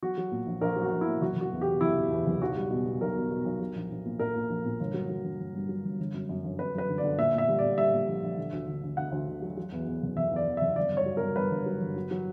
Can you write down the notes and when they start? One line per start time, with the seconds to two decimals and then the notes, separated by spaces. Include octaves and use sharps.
0.03 F#3 F#4
0.18 F#3
0.31 A#2
0.46 A#1
0.61 A#1 A#4
0.76 F#3
0.82 F#4
0.92 A#1
1.01 E4
1.07 A#2
1.21 F#1 F#4
1.36 F#1 F#4
1.52 E2
1.61 B2 G4
1.81 F#1 E4
1.96 B2
2.11 E2
2.27 F#1
2.41 B1 F#4
2.56 G3
2.71 B2
2.86 B2
3.01 B1 A#4
3.15 B2
3.31 B2
3.45 B1
3.60 F#3
3.75 A#1
3.90 A#1
4.05 A#2
4.19 A#2 A#4
4.36 A#2
4.49 A#1
4.65 A#2
4.80 G1
4.94 F#3
5.09 F#3
5.25 G1
5.40 G1
5.55 G2
5.69 F#3
5.84 G1
6.00 G1
6.14 F#2
6.29 F#2
6.44 G1
6.59 F#2 B4
6.74 F#2 B4
6.89 D3
6.98 D5
7.04 D3
7.18 A#2 E5
7.33 A#2 E5
7.48 G3
7.59 D5
7.64 A#2
7.78 G3 E5
7.93 A#2
8.08 A#1
8.23 A#1
8.37 D3
8.52 D2
8.68 D3
8.83 D2
8.97 D2 F#5
9.12 D2
9.28 D3
9.42 F#3
9.57 F#3
9.72 E2
9.87 E2
10.03 F#1
10.17 F#1 E5
10.31 E2 D5
10.46 E2
10.57 F#1 E5
10.76 G1 D5
10.92 G2 C#5
11.06 F#3
11.17 G2 A#4
11.36 G2 B4
11.51 G1
11.66 F#3
11.82 G1
11.96 F#3
12.11 F#3